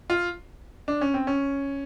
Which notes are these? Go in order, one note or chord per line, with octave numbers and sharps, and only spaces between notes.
F4
D4
C#4
C4
C#4